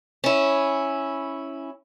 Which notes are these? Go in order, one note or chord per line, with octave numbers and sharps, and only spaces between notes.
C#4 E4